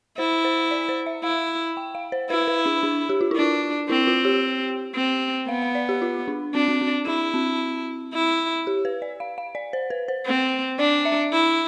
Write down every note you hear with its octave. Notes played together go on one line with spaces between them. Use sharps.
E4 C5
C5
D5
C5
E5
E4 F5
G5
F5
C5
E4 B4
B4
D4
D4
G4
F4
E4
D4
F4
C4 E4
F4
G4
C4
B3 F5
F5
D5
G4
F4
D4
C4 D4
C4
C4
D4 E4
C4
E4
G4
B4
D5
F5
F5
D5
C5
B4
C5
C4
D4 D5
E5
E4